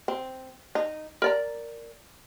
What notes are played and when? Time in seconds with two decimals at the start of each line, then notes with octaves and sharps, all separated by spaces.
0.08 C4
0.75 D#4
1.22 A#4 D5 A#5